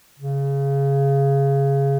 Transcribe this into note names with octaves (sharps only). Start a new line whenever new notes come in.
C#3